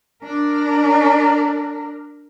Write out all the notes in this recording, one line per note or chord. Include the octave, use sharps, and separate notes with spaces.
D4 A#4